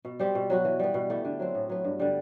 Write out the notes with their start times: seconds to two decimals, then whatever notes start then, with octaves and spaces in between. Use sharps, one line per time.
0.05 B2
0.19 G3 C4 G4
0.35 B2
0.50 F#3 B3 F#4
0.65 E3
0.79 G3 B3
0.94 B2
1.10 A3 E4 G4
1.25 D3
1.39 F#3 C4
1.55 A2
1.69 F#3 B3
1.84 G2
2.00 D3 G3